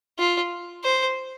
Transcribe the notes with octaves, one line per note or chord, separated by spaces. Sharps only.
F4
C5